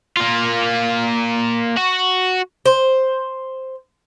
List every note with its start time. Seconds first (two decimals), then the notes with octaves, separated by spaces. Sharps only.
0.16 A#3 F4
1.77 F#4
2.66 C5